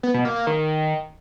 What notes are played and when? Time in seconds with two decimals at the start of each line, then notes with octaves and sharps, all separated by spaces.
0.03 B3
0.14 B2
0.25 A#3
0.36 A#3
0.47 D#3